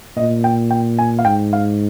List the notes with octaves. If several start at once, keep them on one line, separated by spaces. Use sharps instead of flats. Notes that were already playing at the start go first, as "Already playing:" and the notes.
A#2 D#5
G5
G5
G#5
F5
G#2 G5
F5